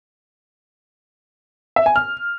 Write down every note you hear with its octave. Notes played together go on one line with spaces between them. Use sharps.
E5
G#5
F6